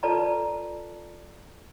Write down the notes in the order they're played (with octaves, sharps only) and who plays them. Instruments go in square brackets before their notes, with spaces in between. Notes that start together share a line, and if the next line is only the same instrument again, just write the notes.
[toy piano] F4 A4 B4 D5 A5 A#5